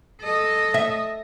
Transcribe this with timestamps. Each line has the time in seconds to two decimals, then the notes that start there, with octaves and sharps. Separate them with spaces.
0.22 A4 D#5
0.74 E5